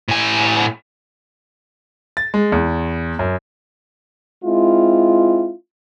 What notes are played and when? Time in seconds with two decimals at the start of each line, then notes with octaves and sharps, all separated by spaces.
0.08 A2 G#5
2.17 A6
2.34 G#3
2.52 E2
3.19 F#2
4.44 G#3 C4 E4 F4